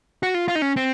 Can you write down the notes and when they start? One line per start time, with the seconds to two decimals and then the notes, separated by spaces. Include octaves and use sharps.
0.23 F#4
0.34 F4
0.48 F4
0.55 D#4
0.62 C#4
0.76 C4